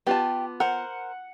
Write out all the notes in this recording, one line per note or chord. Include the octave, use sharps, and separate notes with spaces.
B3 F4 G4 A5
A#4 C5 F#5